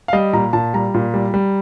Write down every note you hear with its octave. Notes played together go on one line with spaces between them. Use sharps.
F5
G3 D#5
A#2 A#5
A#2 A5
G3 A#5
A#2
G3
G3